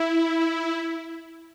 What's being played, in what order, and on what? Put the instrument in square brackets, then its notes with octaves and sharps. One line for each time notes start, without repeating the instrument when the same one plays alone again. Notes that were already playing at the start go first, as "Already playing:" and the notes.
Already playing: [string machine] E4